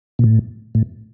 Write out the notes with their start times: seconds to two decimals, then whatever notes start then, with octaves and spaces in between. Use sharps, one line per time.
0.19 A#2
0.24 A2
0.75 A2